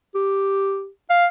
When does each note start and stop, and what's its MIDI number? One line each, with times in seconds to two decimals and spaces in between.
0.15 0.89 67
1.10 1.27 77